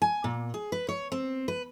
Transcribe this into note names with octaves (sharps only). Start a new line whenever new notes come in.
G#5
A#2
G#4
B4
C#5
C4
B4